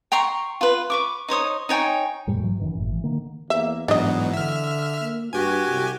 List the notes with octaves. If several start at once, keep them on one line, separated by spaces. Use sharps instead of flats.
G5 A#5 C6 C#6
F4 B4
B4 C#6 D6
D#4 C5 C#5 D#6
D#4 C#5 G5 G#5
F2 A2 G3 G#3
G#2 E3 F#3
F#2 D#3 E3
G#1 A2
E3
D3 D#3 A#3
E2 A#3 E5
G#2 E3 F#3 B3 D4 D#5
D3 E5 F6
A#3
G2 F#4 G4 G#5
C2